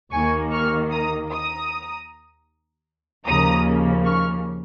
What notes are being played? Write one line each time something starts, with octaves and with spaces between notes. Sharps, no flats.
D#2 D#3 A#3 G#5 C#6
C#6 F6
A#5 D#6
A#5 D#6
D#2 C#3 F3 A#3 A#5 D#6
C#6 F6